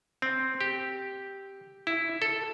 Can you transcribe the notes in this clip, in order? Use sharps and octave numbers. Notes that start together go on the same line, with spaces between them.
C4
G4
E4
A4